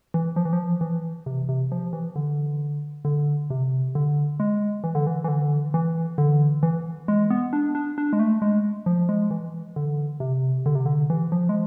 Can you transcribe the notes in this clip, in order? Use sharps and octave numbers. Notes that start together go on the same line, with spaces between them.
E3
F3
E3
F3
E3
C3
C3
F3
E3
D3
D3
C3
D3
G#3
E3
D3
E3
E3
D3
E3
D3
E3
G#3
B3
D4
D4
D4
G#3
A3
G#3
F3
G#3
E3
D3
C3
D3
C3
D3
E3
F3
G#3